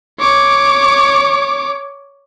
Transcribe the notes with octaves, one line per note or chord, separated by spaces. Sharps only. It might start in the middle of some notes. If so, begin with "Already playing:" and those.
C#5 D6